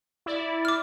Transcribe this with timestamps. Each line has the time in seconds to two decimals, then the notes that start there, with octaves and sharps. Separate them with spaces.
0.26 E4 D5
0.65 D6 F6